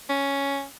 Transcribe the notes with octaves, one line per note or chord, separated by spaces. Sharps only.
C#4